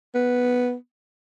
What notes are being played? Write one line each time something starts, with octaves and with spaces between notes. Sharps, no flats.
B3